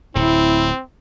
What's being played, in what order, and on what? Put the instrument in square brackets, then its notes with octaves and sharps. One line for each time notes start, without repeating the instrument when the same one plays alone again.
[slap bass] D1 A2 [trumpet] C4 [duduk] E4